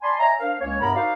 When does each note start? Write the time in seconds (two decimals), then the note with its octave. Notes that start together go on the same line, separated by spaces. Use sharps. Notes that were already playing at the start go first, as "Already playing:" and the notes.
0.02 D5 G#5 A5 B5 C6
0.18 C#5 D#5 E5 G#5 A#5
0.39 D4 A#4 C5 F5
0.60 C#2 A#3 C#4 C#5
0.80 G2 C3 B3 A#4 A#5 B5
0.94 D#4 F#4 A#4 C5 D5 F5